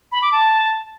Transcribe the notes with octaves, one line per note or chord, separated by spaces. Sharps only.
B5
D6
A5